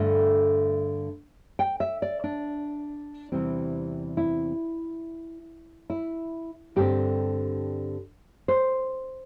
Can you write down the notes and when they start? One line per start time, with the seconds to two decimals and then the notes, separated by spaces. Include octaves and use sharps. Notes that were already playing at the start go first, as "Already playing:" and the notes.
Already playing: G2 D3 A3 E5
1.59 G5
1.80 E5
2.02 D5
2.24 D4
3.32 E2 C3 E3 G3 C4
4.17 E4
5.90 E4
6.76 G2 D3 C4 G4
8.48 C5